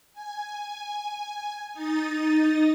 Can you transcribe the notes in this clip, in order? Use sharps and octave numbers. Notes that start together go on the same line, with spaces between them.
G#5
D#4 D#6 A6